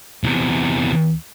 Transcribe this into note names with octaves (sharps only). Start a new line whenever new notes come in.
E2 C3